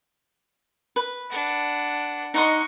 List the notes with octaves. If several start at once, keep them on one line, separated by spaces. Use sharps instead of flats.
B4
D4 F#5
D#4 D#5 F#5 C6 C#6